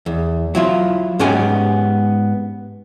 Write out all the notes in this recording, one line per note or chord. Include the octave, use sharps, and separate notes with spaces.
E2
F#3 E4 F4
G#2 B3 C#4 G4 G#5